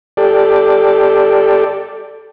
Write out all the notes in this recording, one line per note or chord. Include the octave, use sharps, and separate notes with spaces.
G4 A4 D5